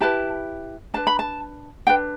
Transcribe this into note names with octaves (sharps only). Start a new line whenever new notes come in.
E4 G4 B4 A5
D4 B4 A5
B5
A5
D4 B4 G5